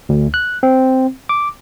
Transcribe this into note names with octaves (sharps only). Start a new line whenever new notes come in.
D2
F#6
C4
D6